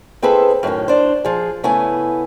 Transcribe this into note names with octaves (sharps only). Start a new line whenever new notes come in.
C4 E4 G#4 A4 B4 C5
F#2 A2 D#3 C#4
D4 C5
F3 G#4
C#3 A3 B3 E4 G#5